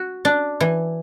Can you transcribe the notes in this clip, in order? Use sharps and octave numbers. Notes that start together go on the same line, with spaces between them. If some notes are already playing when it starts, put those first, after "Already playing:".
Already playing: F#4
D4
E3